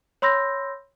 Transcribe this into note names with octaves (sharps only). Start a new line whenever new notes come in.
C#5 B5 C6 E6 G6 A#6